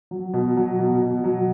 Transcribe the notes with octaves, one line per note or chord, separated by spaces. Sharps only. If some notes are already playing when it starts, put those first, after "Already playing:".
F#3
B2
F#3
B2
B2
F#3